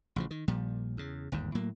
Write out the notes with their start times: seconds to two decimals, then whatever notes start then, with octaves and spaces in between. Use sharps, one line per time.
0.16 A1 C#3 F3
0.31 D#3
0.48 A#1 A#2 F3 G3
0.97 E2 C#3
1.32 G1 D#2 G#2
1.55 A2 F#3 A#3